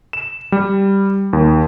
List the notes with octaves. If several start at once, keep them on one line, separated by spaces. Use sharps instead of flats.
E7
G3
D#2